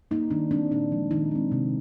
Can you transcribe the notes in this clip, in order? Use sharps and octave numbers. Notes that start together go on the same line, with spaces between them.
G3 A#3 D#4
D#3 D4
G3 C4 D4
A#2 D4
F3 G#3
D#3 D#4
G#3 C4
C3